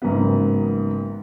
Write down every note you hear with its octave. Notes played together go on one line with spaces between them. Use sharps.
A1 G#2 C#3 F#3 A#3 B3